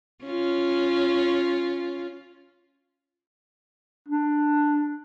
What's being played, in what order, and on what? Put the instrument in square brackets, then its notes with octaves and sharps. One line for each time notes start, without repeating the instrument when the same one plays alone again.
[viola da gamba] C#4 F4
[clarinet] D4